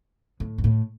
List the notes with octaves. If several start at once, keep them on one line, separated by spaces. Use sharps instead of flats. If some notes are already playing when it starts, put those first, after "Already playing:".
A2
G2
A2